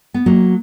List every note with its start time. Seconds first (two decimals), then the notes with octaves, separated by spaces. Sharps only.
0.14 B3
0.26 F#3 A#3